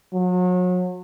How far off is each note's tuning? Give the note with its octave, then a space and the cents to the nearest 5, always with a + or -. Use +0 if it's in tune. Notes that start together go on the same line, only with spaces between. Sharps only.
F#3 -35